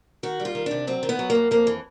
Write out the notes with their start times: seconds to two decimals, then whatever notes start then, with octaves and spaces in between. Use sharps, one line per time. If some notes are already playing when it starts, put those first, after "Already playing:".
0.23 D#3 F#4
0.40 G3
0.45 F4
0.55 D#3
0.66 C3 D4
0.87 F#3 C4
1.03 D#3
1.09 B3
1.19 F#3
1.30 A#3
1.35 F#2
1.51 F2 A#3
1.67 E3